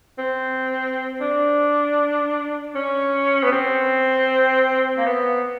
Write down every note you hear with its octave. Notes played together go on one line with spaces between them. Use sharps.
C4
D4
C#4
B3
C4
A#3
B3